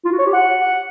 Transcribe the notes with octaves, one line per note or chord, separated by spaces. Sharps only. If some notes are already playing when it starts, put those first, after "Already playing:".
F4
F#4
C#5
G4
F#5